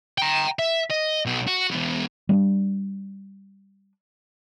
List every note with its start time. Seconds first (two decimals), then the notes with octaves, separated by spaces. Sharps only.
0.18 G5 A#5
0.59 E5
0.90 D#5
1.25 B1 B2
1.47 F#4
1.71 E2 B2
2.29 G3 A3 D4